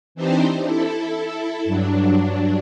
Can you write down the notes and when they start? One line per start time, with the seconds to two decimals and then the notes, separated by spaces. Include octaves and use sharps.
0.15 E3 C4 D4 D#4 G4 C5
0.63 E4 A4
1.64 G2 F#3 D4